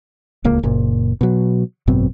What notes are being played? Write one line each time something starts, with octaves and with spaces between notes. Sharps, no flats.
D1 C#2 A#3
F#1 A#2
B2 F#3
G#1 F#2 B2 C4